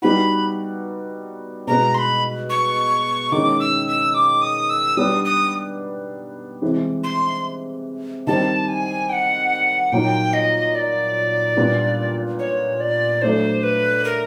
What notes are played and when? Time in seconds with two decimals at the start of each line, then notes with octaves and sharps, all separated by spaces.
0.02 G3 B3 D#4 F#4 B5
1.67 B2 G#3 B3 A#5
1.94 C6
1.99 B5
2.50 C#6
3.32 D#3 G#3 C#4 D6
3.60 E6
3.87 E6
4.14 D6
4.42 D#6
4.70 E6
4.97 G3 B3 D4 G4 D#6
5.25 D#6
6.62 C3 E3 G#3
7.04 C6
8.27 D#3 G3 C4 A5
8.68 G#5
9.09 G5
9.13 F#5
9.92 A#2 F#3 A#3 D#4 G5
10.33 D#5
10.75 D5
11.57 A#2 G3 B3 D4
12.39 C#5
12.80 D5
13.22 F#3 A3 D4 C5
13.63 B4
14.05 A#4